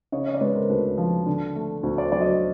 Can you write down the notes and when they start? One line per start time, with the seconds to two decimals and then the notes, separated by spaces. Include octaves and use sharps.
0.12 C#3 C#5 D#5
0.26 C#5 D#5
0.34 D5
0.41 G#3 B4 C#5
0.55 A#4 C5
0.69 D2 A4 B4
0.98 F3
1.26 D3
1.55 A3
1.83 D2
1.97 C5 D5
2.12 F#3 C5 D5
2.21 D#5
2.26 C5 D5